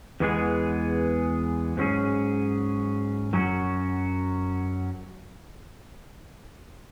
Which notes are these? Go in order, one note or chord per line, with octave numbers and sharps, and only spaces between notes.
E2 E3 G#3 B3 G#4
G#2 F#3 C#4 G#4
F#2 F#3 C#4 F#4